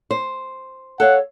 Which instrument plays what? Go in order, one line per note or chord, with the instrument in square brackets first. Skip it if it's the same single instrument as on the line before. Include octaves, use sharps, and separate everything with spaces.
[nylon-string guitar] C5
[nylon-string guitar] A4 C#5 F5 [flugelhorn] F#5